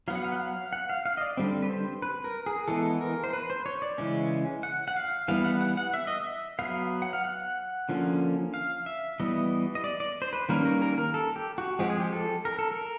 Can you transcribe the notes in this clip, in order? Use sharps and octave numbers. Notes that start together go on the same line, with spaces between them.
F#3 B3 F5
F#5
F5
F#5
F5
F#5
F5
F5
D#5
D5
D3 G3 C4
B4
C5
B4
A#4
G#4
E3 G#3 B3 A4
A#4
C5
B4
C5
C#5
D5
C#3 E3 G#3 C#4
F#5
F#5
F5
E3 G3 B3 F5
F#5
F#5
F#5
E5
D#5
E5
F#3 B3 F5
F#5
F5
F#5
D3 F3 A#3 C#4
F5
E5
E3 G3 B3 D#5
D#5
D5
D5
C5
B4
D#3 G3 A#3 C#4 A#4
A#4
A#4
A#4
A4
G4
F#4
F3 G#3 C4 G4
G#4
G4
A4
A#4
A4
A#4